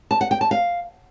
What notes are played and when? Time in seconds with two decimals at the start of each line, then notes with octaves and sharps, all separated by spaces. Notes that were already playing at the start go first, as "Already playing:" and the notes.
0.11 A5
0.21 F#5
0.31 G5
0.41 A5
0.51 F5